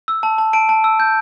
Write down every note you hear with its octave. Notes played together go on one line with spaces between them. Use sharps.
E6
A5
A5
A5 D7
A5
E6
G6